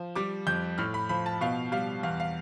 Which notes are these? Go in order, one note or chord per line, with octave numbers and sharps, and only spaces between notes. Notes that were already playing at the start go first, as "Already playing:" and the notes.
Already playing: F3
G3 D6
F2 G6
A2 F6
B5
F3 B5
A5
B2 F5
G3 F5
E2 F5
F5